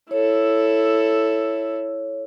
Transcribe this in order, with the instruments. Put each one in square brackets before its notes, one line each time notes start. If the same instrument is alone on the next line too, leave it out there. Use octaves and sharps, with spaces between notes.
[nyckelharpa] E4 A4 [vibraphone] C#5